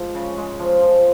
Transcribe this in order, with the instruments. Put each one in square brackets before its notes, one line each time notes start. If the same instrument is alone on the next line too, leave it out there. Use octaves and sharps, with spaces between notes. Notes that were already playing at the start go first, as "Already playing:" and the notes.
Already playing: [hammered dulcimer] F3 G#3
C#3
G#3
F3
F3